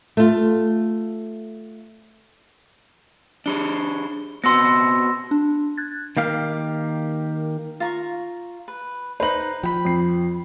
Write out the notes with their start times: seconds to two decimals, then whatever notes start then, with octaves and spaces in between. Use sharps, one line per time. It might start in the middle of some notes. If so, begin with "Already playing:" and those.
0.17 A3 F4
3.46 D4 G4 G#4 G7
4.44 B3 C4 F#4 C6 E6 A#6
5.31 D4
5.77 F#6 G#6 A6
6.17 D#3 A#3 G4 F5
7.80 F4 A#5 C#6
8.68 B4
9.20 D#4 B4 C5 F#7
9.63 F3 G5 B5
9.85 F2 C7